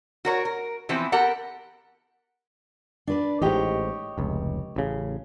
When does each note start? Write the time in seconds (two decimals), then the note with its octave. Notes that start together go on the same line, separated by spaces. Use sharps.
0.25 F#4 A#4 C#5
0.45 A#4
0.89 E3 F3 B3 C4 C5
1.12 G4 A4 A#4 F#5
3.07 D4 B4 D5
3.42 A1 G#2 G4 C#5 D#5
4.18 F1 C#2
4.76 A1 C#3